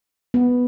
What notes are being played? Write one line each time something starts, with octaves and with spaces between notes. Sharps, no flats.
B3